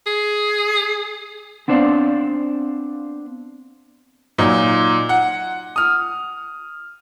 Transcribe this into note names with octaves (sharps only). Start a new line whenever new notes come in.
G#4
B3 C4 D4 C5 D5 F5
A#2 F#3 D#4
F#5
D#6 F6